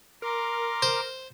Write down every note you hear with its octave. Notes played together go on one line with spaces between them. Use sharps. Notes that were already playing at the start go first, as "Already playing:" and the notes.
A#4 A#5 C6 D6
C5